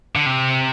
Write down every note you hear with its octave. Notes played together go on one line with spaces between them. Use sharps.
D3
C3